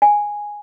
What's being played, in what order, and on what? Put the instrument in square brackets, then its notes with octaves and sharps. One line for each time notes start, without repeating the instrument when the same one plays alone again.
[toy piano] G#5